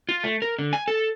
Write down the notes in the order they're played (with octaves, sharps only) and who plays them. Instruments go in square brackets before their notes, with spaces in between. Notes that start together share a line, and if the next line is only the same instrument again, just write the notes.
[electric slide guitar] F4
A3
A#4
D3
G#5
A4